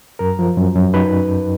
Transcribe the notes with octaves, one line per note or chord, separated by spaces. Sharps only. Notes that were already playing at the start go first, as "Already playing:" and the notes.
F#2 A#4
F3
F#2
F#2
D#4 B4